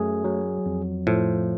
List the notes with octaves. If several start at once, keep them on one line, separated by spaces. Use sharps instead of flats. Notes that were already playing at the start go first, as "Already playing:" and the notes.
Already playing: F#2 A3 G#4
F#3
F2
A2 F3